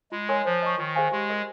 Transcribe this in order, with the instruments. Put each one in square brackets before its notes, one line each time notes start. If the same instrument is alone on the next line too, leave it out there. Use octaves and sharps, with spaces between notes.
[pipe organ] G#3 [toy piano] F4
[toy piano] A#4 C#5 G#5 C6
[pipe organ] F3 [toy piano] C5
[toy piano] D#5 A#5 C#6
[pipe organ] D#3 [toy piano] F4
[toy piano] G#4 C5 F5 G#5
[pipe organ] G#3 [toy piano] G4
[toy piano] A#4 D#5